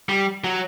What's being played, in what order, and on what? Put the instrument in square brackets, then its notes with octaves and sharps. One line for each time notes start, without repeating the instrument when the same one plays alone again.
[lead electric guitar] G3
F#3